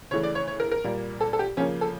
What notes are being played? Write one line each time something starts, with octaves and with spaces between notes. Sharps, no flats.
C#3 E3 A3 C#5
D5
C#5
C#5
A#4
A#4
A#2 G3 A#3
A4
A4
G4
C#3 F3 A#3 C#4
A4